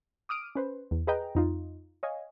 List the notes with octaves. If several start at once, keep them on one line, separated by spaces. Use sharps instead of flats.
D6 D#6 F6 D7 D#7
C#4 B4 C5
E2
G#4 B4 D#5 G5 A#5
F2 D#4 F4
C#5 D#5 F5 G#5